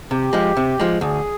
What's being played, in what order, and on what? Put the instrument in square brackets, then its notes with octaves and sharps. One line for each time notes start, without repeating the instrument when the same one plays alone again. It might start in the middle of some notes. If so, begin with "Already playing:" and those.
[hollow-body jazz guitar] C3 [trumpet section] G4
[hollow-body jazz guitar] F3 G#3
C3
F3 G#3
[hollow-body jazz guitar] D2 [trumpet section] G#4